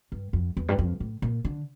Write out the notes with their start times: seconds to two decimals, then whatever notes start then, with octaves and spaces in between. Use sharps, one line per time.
0.12 G2
0.33 F2
0.57 E2
0.68 G2
0.79 F2
1.00 A2
1.22 A#2
1.45 D3